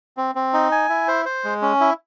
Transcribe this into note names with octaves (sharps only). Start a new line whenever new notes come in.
C4
C4
D#4
G#5
E4
C5
C5
G#3
C#4
E4